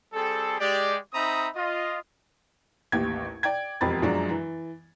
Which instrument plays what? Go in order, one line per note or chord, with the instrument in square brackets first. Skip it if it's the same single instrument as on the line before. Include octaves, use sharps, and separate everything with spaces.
[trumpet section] G3 C4 G#4 A4
G#3 G4 D5
C4 D#4 E5 A#5 B5 D#6
F4 D#5
[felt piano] A1 D#2 G4 G#6
D5 G5 G#6
E1 F2 G4 B5 A6
F#2 F3 F#3 G#3 D4
E3